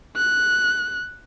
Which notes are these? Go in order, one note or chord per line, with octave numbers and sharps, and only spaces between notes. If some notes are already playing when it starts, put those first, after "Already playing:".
F#6